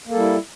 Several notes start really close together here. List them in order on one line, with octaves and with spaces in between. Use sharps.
A#3 A4 G3 E4